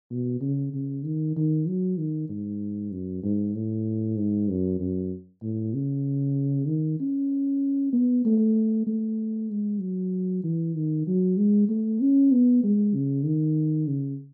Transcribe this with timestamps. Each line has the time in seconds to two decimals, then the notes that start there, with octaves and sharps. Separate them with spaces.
0.10 B2
0.41 C#3
0.74 C#3
1.04 D#3
1.36 D#3
1.68 F#3
1.98 D#3
2.29 G#2
2.92 F#2
3.23 G#2
3.55 A2
4.17 G#2
4.49 F#2
4.79 F#2
5.43 A2
5.74 C#3
6.67 D#3
7.00 C#4
7.93 B3
8.25 A3
8.87 A3
9.50 G#3
9.81 F#3
10.43 E3
10.76 D#3
11.07 F#3
11.37 G#3
11.69 A3
12.01 C#4
12.32 B3
12.64 G#3
12.94 C#3
13.25 D#3
13.88 C#3